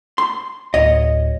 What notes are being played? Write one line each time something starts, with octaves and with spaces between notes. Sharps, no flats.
C6
D1 C#5 D#5